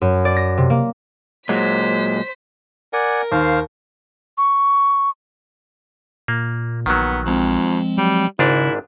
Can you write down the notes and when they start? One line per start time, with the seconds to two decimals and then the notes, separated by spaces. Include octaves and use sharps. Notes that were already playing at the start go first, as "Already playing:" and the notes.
0.02 F#2
0.25 D5
0.37 A#6
0.58 C3
0.70 A#3
1.49 A#2 F#3 G#3 C5 B6
2.93 A#4 D5 F#5 G#5
3.32 D#2 C5 F5
4.38 C#6
6.28 A#2 A#3
6.86 A#1 D#3 F#3 B3
7.26 F2 F3 G#3 C4
7.98 F#3 G3
8.39 G#1 G#2 C#3 D4 E4